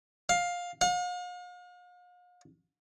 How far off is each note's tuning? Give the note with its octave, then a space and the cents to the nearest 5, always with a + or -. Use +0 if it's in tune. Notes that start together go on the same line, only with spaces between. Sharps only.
F5 +15
F5 +45